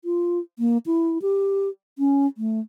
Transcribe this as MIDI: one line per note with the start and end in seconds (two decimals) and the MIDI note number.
0.05 0.39 65
0.59 0.78 58
0.86 1.18 64
1.22 1.69 67
1.99 2.26 61
2.37 2.60 57